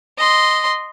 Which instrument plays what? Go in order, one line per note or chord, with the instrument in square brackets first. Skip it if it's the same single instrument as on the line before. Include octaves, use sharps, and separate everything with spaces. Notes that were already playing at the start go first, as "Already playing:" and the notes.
[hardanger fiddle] D#5 C6